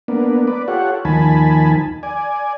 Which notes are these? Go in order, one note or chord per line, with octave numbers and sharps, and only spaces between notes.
A#3 B3 D4
B4 D5
F4 G4 A4 C#5 F#5
D#2 D#3 F3 G#5 A5 B5
D5 G#5